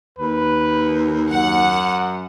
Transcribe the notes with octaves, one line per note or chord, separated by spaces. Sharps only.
D#2 B4
F#2 F#5